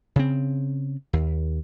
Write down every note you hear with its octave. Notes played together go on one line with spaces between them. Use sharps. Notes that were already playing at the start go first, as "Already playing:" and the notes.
C#3 C4
D#2